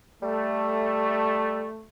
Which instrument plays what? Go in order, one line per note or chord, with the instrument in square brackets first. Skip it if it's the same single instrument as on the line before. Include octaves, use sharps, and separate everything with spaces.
[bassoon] G3 [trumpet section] A3